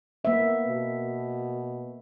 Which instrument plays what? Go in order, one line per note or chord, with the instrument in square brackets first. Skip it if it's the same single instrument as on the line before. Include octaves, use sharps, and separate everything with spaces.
[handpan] A#3 E5 [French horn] B3
[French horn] B2